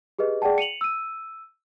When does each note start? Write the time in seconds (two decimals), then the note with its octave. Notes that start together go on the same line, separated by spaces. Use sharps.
0.19 G4 G#4 B4 D#5
0.42 G#4 D5 F#5 G5 A5
0.58 C#7 D#7 F7 F#7
0.81 E6 D#7